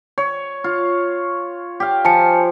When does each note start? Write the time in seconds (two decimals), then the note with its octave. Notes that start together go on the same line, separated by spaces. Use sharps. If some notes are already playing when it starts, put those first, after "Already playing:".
0.18 C#5
0.64 F4
1.80 G4 F5
2.05 F3 G#5 A5 C#7